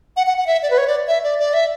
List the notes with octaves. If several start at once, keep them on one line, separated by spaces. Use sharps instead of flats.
F#5
F#5
F#5
E5
D5
B4
C#5
D5
E5
D5
D5
E5